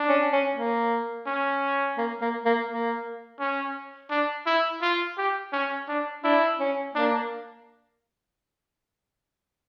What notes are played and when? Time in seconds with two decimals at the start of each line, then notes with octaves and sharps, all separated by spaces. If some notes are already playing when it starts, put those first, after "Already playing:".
Already playing: D4
0.09 C#4
0.33 C#4
0.55 A#3
1.27 C#4
1.98 A#3
2.21 A#3
2.45 A#3
2.69 A#3
3.40 C#4
4.10 D4
4.46 E4
4.82 F4
5.18 G4
5.53 C#4
5.88 D4
6.24 D4 E4
6.60 C#4
6.94 A#3 D4